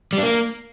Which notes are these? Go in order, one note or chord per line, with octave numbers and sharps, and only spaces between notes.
G3
D4
A#3